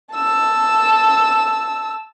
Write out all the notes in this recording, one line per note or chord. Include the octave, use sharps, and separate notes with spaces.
A5 E6